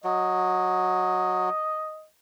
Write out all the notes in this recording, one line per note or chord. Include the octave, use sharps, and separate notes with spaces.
F#3 D#5